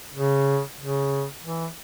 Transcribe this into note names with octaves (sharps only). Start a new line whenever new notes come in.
C#3
C#3
E3